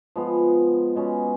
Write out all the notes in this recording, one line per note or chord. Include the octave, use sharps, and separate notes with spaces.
F3 G#3 B3
B2 G#3 C#4